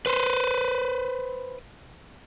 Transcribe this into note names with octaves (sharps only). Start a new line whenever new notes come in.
B4 C5